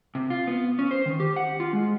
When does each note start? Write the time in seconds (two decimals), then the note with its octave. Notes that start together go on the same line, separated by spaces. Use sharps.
0.15 C3
0.30 F4
0.47 B3
0.79 C#4
0.91 C5
1.06 D#3
1.20 G4
1.36 F#5
1.60 F4
1.73 G#3